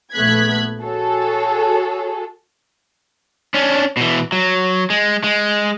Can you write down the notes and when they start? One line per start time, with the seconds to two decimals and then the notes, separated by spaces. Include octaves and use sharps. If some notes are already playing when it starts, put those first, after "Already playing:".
0.13 A#1 A3 B3 F#6 G#6 B6
0.81 F#4 G#4 A4 C#5
3.54 C#4 D4
3.97 B2 E3
4.32 F#3
4.90 G#3
5.24 G#3